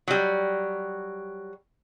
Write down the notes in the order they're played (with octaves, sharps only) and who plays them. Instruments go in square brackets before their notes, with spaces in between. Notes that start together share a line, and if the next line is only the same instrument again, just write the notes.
[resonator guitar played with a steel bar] F#3 G3